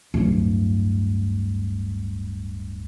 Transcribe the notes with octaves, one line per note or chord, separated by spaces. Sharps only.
D1 G2